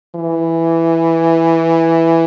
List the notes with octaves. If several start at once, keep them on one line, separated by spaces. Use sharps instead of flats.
E3